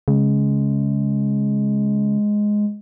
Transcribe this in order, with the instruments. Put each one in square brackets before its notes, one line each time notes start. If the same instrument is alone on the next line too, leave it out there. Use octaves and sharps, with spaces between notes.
[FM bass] C#3 [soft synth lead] G#3